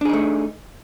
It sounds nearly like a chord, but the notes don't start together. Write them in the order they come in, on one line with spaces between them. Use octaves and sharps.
D4 G#4 D#4 A3